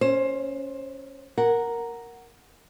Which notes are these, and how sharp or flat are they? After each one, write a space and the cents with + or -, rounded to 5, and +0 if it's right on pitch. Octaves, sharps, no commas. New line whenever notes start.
C#4 +0 C5 +20
A#4 +0 F#5 +0